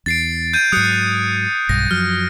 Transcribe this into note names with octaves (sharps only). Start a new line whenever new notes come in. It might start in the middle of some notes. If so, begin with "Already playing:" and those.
E2 A6 C7 D7
G6 G#6 D#7
G#2 F#3 D#6 F#6 C#7
B1 G2 A#6
F#2 F3 F#3 F6